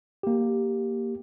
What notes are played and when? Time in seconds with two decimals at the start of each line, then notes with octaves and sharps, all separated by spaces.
0.23 A#3 G4